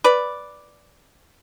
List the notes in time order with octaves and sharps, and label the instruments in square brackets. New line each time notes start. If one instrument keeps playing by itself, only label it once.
[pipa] B4 D5